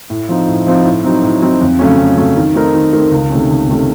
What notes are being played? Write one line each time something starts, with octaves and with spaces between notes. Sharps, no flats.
A2
F3 C4 D#4
A2
F3 C4 D#4
A2
F#3 C4 D#4
A2
F#3 C4 D#4
F2
C#3 F#3 A3 C#4
F2
C#3 F#3 A3 C#4
D#3
A3 C4 D#4 A#4
D#3
A3 C4 D#4 A#4
C#2
C3 D#3 A3 C#4
C#2
C3 D#3 A3 C#4